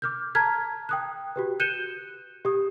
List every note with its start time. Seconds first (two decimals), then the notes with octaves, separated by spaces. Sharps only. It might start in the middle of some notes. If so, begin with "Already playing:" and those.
0.02 D6 F6 G6
0.35 A5 A#5 F6 G#6 B6
0.89 G5 D#6 F#6
1.36 F#4 G4 B4
1.60 F#6 G6 C#7 D#7 E7 G7
2.45 G4 D#6